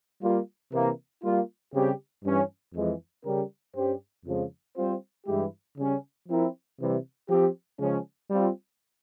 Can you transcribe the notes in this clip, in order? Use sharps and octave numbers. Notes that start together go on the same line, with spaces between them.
G3 A#3 F4
C3 E3 A#3
G3 A#3 F4
C#3 G3 C4 G4
G2 E3 G3 C#4
F2 E3 G#3
C#3 G3 C#4 G4 A#4
G2 G3 C#4 G4 C5
F2 C#3 F3 G#3
G3 C4 F4 C5
G2 E3 G#3 E4 G4
C#3 G3 C#4
F3 C4 E4 A#4
C3 E3 G3
F3 C4 G4
C#3 F3 G#3 C#4
G3 C4 F4